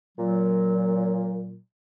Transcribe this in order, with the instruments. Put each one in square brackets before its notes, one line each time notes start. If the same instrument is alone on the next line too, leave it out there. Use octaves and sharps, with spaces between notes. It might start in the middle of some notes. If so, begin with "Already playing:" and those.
[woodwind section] A#2 F#3